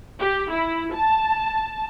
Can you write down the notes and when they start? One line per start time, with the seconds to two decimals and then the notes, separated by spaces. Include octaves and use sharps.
0.20 G4
0.51 E4
0.95 A5